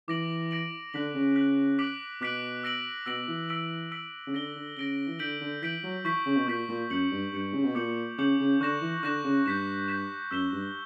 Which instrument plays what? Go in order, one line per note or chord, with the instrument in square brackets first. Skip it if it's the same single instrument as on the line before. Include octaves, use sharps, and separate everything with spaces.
[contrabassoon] E3 [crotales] D6 A#6 D7 F#7
[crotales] D6 A#6 D7 F#7
[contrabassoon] D3 [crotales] F#6 B6 F#7
[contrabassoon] C#3
[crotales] F#6 B6 F#7
D6 F#6 B6 D7 F#7
[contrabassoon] B2 [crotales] D6 F#6 B6 D7 F#7
[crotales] E6 A#6 D7 F#7
[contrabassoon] B2 [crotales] E6 A#6 D7 F#7
[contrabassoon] E3
[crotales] E6 B6 D7 F#7
E6 B6 D7 F#7
[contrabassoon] C#3
[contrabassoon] D3 [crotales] A#6 D7 G7
[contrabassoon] D3
[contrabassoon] C#3 [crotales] A#6 D7 G7
[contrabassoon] E3
[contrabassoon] D3 [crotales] G6 B6 D7 F#7
[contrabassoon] D3
[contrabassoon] E3 [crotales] G6 B6 D7 F#7
[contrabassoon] F#3
[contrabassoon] E3 [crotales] C#6 G6 B6
[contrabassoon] C#3
B2
[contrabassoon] A#2 [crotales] C#6 G6 B6
[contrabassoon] A#2
[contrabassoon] F#2 [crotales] G6 C#7 F#7
[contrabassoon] G2
[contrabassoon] G2 [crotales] G6 C#7 F#7
[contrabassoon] C#3
B2
[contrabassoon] A#2 [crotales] D6 G6 C#7 F#7
[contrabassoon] C#3 [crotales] D6 G6 C#7 F#7
[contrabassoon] C#3
[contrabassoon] D3 [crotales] C#6 F#6 A#6 E7
[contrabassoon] E3
[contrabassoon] D3 [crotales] C#6 F#6 A#6 E7
[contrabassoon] C#3
[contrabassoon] G2 [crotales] G6 B6 E7
[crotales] G6 B6 E7
[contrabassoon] F#2 [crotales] E6 B6 E7 G7
[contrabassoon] G2